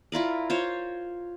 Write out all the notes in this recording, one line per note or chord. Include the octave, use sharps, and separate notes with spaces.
E4 F4 A#4 D5
F4 C5 C#5